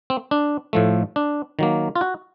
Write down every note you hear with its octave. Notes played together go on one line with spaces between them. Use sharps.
C4
D4
A2 F3 A3
D4
D#3 F#3 A#3
F4
F#4